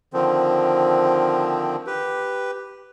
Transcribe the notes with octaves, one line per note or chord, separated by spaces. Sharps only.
D3 D#3 F3 C4
G4 B4